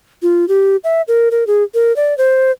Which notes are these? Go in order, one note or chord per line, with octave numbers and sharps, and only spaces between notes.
F4
G4
E5
A#4
A#4
G#4
A#4
D5
C5